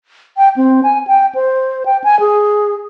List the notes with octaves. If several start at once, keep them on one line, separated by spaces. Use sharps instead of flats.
G5
C4
G#5
G5
C5
G5
G#5
G#4